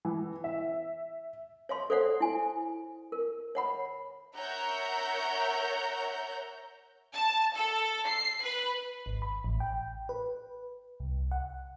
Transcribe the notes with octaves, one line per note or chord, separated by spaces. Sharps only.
E3
E5
C#5 F5 C6
A4 C5 D5 F5 F#5
E4 G#5
A#4
C#5 F#5 B5
A#4 C#5 E5 F#5 A#5 G6
A5
A4
C7
B4
G#1
B5
A1
G5
B4
C2
F#5